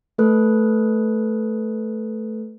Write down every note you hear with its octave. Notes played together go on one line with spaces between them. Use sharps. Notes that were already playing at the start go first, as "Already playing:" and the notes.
A3 A4 B4 F#6